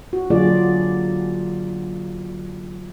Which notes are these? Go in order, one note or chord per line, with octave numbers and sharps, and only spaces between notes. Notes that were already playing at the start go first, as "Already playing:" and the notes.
F#4
D3 F#3 A#3 F4 G#4 D5